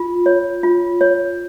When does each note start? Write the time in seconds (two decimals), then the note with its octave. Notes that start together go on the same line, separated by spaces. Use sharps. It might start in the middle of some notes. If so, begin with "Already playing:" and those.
Already playing: F4
0.26 C#5
0.63 F4
1.01 C#5